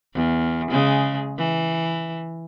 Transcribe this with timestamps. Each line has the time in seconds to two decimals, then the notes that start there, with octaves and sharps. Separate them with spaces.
0.14 E2
0.71 C#3 G#3
1.37 E3